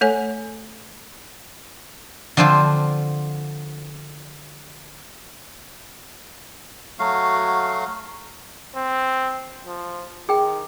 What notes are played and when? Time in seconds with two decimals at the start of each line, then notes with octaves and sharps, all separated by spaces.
0.01 A3 A4 C#5 G#5
2.37 D3 F3 C4 D4 F4 C5
6.99 F#3 A3 F#4 F5
8.76 C4
9.66 F3
10.29 D#3 G#4 G5